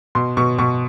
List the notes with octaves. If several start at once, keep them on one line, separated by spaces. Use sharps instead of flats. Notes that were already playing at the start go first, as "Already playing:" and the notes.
B2 C6
B2 C#6
B2 C#6